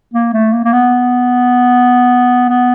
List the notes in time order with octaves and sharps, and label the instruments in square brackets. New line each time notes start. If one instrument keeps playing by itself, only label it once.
[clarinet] A#3
A3
A#3
A#3
B3
B3